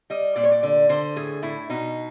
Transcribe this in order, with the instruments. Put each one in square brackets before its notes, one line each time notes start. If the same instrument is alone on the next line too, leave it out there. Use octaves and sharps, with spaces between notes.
[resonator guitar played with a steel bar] G3 D#5
A#2 D5
C#5
D5
D3 D5
D3 C5
A2 G#4
A2 E4
B2 D#4